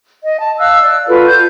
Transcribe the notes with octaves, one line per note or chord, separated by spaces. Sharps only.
D#5
A5
F5 E6 F#6
D5
F4 F#4 A4 B4
G6